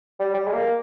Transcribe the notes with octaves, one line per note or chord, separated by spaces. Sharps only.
G3
G3
G#3
A#3